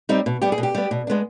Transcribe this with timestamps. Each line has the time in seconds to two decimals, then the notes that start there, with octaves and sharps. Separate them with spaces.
0.09 G3 C4 D#4
0.26 B2
0.42 G3 B3 G4
0.52 G#4
0.58 B2
0.63 G4
0.75 G3 B3
0.91 B2
1.07 G#3 B3 D4